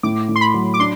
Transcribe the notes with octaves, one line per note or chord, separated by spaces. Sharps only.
A2 D6
A2
C6
B5
F#3
D6
D4 C6